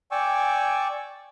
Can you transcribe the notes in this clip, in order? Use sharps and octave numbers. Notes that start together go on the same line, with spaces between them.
D5 G5 G#5 C#6 D6 E6